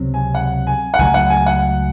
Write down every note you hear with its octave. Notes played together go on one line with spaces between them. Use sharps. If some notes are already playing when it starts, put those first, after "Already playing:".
Already playing: C#2 C3 F#3 C4
G#5
F#5
G#5
F#5
C#2 C3 F#3 A3 G#5
F#5
G#5
F#5